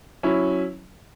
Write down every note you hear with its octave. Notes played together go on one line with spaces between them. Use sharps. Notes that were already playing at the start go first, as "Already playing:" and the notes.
F#3 C#4 E4